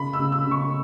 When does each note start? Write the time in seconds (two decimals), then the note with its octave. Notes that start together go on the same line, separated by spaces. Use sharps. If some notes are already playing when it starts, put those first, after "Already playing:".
Already playing: C#3 B5
0.13 E6
0.19 C#3
0.32 E6
0.45 C#3
0.51 C#6